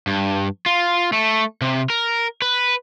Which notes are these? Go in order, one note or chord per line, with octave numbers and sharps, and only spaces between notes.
G2
F4
A3
C3
A#4
B4